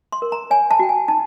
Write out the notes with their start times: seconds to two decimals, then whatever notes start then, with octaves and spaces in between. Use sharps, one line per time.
0.12 C6
0.22 A#4
0.32 A#5
0.51 C#5 G#5
0.71 A5
0.79 F#4 G5
0.89 G#5
1.08 D#4 A5